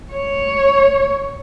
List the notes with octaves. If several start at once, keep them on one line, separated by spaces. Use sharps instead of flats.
C#5